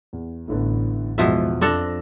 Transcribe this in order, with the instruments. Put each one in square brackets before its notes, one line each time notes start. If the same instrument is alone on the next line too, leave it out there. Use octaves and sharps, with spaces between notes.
[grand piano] E2
[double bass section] A1 [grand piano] A2 D3 B3
[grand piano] E2 [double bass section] G#2 [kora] B2 F3 E5
[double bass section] F2 [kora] C4 D4 A4 [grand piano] E6 A#6